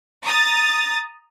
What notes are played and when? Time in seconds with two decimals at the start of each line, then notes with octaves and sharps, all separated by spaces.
0.24 A#5 D#6 A6